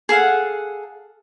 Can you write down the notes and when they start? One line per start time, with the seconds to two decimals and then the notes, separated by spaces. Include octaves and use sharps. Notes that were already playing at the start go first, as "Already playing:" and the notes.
0.09 G#4 A4 F5 F#5